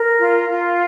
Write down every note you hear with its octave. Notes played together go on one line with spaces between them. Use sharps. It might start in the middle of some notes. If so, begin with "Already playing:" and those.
Already playing: A#4
F4
F4